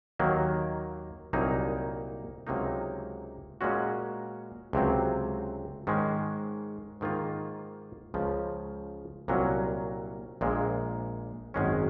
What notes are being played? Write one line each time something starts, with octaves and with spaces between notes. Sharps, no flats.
D#2 D#3 F#3 A#3
C2 A#2 F#3 A#3 D#4
C#2 C3 F#3 A#3 D#4
A#2 G#3 C#4 F#4
C#2 C3 F#3 C4
G#2 D#3 G#3 C#4
G#2 D#3 A#3 F4
C#2 C#3 F3
C2 A#2 F#3 C#4
A#1 A#2 G#3
G#1 F#2 D#3 G#3 C#4